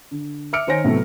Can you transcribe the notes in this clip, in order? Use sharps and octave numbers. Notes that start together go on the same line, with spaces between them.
D3
E5 D6 E6 F6 C#7 D7
D#3 D#4 C5 C#5 G#5 A#6
A2 C3 F#3 A3 B3